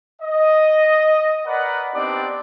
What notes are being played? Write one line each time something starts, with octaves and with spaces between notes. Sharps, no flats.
D#5
A#4 B4 D5 D#5 F#5
B3 C4 D4 D#4 G4 D5